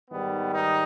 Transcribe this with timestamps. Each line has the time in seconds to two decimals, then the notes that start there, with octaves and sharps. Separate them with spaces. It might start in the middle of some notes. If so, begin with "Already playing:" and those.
0.11 G#2 D#3 G3 B3
0.53 D#4